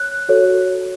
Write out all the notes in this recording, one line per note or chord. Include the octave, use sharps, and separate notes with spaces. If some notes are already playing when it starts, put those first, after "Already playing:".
Already playing: C#5 F#6
F#4 A4 C#5